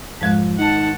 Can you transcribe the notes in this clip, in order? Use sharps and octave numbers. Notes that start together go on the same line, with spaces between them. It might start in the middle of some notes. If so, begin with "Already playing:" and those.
F2 G#2 G#3 F#6
D#3 F#5 A5